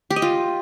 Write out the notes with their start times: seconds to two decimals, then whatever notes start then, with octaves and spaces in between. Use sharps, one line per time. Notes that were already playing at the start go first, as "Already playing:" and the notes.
0.10 G4
0.16 D#5
0.22 F4